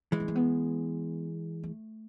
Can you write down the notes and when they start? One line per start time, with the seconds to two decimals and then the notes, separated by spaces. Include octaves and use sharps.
0.12 E3 G#3
0.20 B3
0.28 A3
0.35 B3
1.64 A3